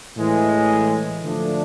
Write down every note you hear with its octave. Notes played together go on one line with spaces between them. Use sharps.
A2 E3 G#3
D3 F3 A3 D4